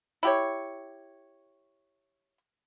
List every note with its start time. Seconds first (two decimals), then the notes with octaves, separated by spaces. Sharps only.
0.23 E4 G4 C#5